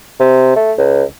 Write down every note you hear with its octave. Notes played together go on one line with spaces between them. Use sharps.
C3
A3
C#2